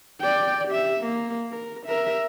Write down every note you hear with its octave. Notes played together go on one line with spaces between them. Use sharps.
D5 G5
G4 E5
A#3
A#4
A#4 E5